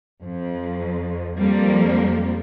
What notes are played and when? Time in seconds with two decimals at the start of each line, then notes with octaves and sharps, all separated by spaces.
0.23 F2
1.37 F2 F3 G3 A#3